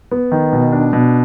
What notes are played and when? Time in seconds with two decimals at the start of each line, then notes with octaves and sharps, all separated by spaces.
0.11 B3
0.32 D#3
0.52 B2
0.72 D4
0.93 B2